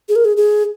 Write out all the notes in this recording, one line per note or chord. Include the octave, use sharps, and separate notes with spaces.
G#4
A#4
G#4
G#4